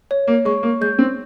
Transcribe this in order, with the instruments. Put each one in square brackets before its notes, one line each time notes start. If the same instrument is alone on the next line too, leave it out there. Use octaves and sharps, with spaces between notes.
[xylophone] C#5
[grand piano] A#3
[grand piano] G#3 [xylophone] C#6
[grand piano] A#3
[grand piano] G#3 [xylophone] G6
[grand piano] C4